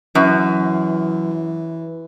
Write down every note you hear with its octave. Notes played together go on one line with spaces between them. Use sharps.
F#2 E3